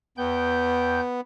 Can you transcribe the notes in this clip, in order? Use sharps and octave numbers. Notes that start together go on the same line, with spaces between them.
E2 B3 G5 G6